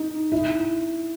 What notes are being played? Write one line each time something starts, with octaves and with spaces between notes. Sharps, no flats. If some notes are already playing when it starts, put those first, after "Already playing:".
Already playing: D#4
E4